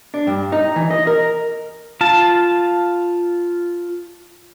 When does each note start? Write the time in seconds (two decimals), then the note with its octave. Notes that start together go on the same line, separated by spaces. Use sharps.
0.14 D4
0.27 G2
0.52 D#4
0.76 E3
0.90 D#5
1.07 A#4
2.01 F4 A5